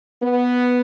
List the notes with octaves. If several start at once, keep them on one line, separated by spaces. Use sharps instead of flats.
B3